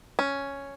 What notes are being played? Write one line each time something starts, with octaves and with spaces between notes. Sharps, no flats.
C#4